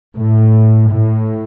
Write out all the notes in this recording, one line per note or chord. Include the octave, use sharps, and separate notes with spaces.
A2
A2